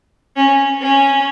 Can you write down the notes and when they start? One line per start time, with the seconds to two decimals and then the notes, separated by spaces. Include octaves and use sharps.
0.36 C#4
0.81 C#4